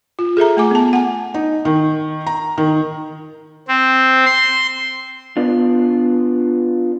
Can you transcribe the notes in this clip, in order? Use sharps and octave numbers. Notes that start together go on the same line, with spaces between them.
F4
G#4 A4 E5 A#5
A3 G#5 D6
B3 A5
F#5 G#5
D#4
D#3
A#5
D#3
C4
C6
B3 D4 F4